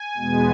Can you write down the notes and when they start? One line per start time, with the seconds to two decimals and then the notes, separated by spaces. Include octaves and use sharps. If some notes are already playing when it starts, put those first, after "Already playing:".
Already playing: G#5
0.17 E2 B2 G#3 B3